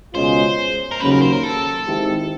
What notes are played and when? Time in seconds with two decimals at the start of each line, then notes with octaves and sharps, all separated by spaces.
0.14 C#2 B2 G#3 C#4 F4 C5
0.91 A#4
1.00 D#2 C#3 F#3 A#3 C#4 B4
1.11 A#4
1.21 C5
1.32 A#4
1.43 A4
1.86 D#3 G#3 C4 E4 G4